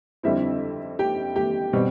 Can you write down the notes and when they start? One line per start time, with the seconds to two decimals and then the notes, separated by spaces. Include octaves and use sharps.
0.23 F2 D3 G3 C4 E4 E5
0.99 G4 G5
1.36 G4 G5
1.73 B2 G3 C4